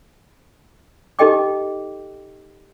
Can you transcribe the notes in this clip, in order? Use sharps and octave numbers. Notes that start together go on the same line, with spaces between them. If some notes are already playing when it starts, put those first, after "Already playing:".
D#4 G4 A4 D#5 G5 D6